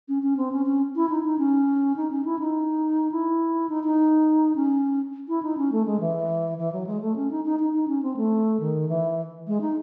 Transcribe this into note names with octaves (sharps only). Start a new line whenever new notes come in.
C#4
C#4
C4
C#4
C#4
E4
D#4
D#4
C#4
D#4
C#4
E4
D#4
E4
D#4
D#4
C#4
E4
D#4
C#4
A3
G#3
E3
E3
F#3
G#3
A3
C#4
D#4
D#4
D#4
D#4
C#4
C4
A3
D#3
E3
G#3
D#4